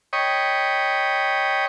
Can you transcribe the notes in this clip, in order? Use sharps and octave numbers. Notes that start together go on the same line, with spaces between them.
C#5 D#5 G5 B5 C#6 D#6